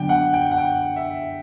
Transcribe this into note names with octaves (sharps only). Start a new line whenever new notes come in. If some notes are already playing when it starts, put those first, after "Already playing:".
Already playing: F#2 D3 F#3 B3 D4 G5
F#5
G5
F#5
G5
E5